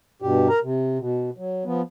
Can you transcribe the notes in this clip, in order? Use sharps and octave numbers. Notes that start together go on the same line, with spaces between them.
G2 B2 G4
A#4 A#5
C3
B2
F#3
F3 B3